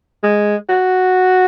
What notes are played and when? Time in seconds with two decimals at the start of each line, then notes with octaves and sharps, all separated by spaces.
0.23 G#3
0.69 F#4